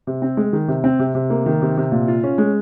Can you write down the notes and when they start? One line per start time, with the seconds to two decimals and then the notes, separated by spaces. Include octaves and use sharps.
0.07 C3
0.22 C4
0.37 G#3
0.53 D#3
0.68 C3
0.84 C4
0.99 C3
1.15 C3
1.30 A#3
1.46 D#3
1.62 C3
1.77 C3
1.92 A#2
2.08 F4
2.24 C#4
2.38 G#3